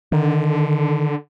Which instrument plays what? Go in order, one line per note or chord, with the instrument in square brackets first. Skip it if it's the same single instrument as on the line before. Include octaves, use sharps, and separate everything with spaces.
[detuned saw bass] D3 [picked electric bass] D#3